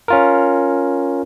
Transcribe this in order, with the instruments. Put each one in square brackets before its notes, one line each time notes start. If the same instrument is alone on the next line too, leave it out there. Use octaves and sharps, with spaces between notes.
[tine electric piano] C#4 F4 A#4